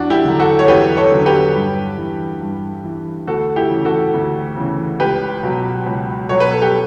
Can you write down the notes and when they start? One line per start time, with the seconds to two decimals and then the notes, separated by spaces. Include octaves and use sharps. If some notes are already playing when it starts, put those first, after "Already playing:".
Already playing: E2 D4 F#4
0.10 E4 G4
0.25 D3 F#3
0.40 F#4 A4
0.59 C#5
0.68 E2 G4 B4
0.97 A4 C#5
1.12 D3 F#3
1.26 G4 B4
1.55 G2
1.98 E3
2.41 G2
2.84 E3
3.27 D2 F#4 A4
3.56 E4 G4
3.70 C#3 E3
3.85 F#4 A4
4.14 D2
4.57 C#3 E3
5.00 C#2 G4 B4
5.43 B2 F#3
5.86 C#2
6.29 B2 F#3 C#5
6.40 B4
6.51 A4
6.62 G4